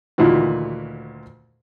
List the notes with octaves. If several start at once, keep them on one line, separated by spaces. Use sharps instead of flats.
D2 A#2 D#3 E3 F#4